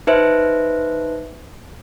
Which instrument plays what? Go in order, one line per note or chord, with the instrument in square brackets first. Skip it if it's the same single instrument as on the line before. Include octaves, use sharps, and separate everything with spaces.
[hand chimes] D#4 B4 C5 E5